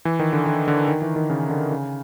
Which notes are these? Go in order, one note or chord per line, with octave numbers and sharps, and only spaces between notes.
E3
D#3
D3
D3
D3
D#3
E3
D#3
C#3
D3
C#3